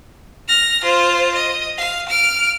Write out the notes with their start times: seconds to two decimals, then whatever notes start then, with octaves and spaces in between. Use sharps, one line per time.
0.48 F6 A#6
0.84 F4 C5
1.35 D#5
1.78 F5
2.09 F6 D7